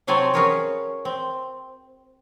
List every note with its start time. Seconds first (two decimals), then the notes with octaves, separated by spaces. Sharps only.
0.07 C3 F#3 C4 C#5 G#5 A5
0.34 C#4 F#4 G#4 A#4 B4 C#5
1.05 C4